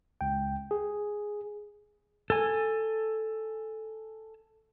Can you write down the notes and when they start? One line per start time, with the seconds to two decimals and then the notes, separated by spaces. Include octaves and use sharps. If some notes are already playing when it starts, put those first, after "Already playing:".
0.21 C#2 G5
0.71 G#4
2.30 A4 G#5